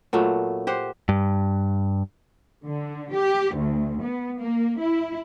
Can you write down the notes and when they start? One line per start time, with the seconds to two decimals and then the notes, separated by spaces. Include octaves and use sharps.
0.13 A#2 F#3 A3 B3
0.67 G4 C5 F#5
1.09 G2
2.65 D3
3.13 G4
3.55 D2
4.02 B3
4.39 A#3
4.81 E4